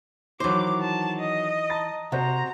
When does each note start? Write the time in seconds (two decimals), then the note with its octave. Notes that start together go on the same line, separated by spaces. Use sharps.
0.40 D#3 E3 F#3 C5 D6
0.80 A5
1.19 D#5
1.70 A5 A#5 A6
2.12 C3 F#4 C5 A#5